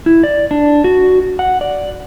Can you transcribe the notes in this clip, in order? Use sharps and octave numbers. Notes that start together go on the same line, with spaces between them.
E4
D5
D4
F#4
F#5
D5